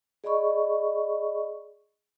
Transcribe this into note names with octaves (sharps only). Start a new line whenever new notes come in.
G#4 D5 D#5 B5 C#6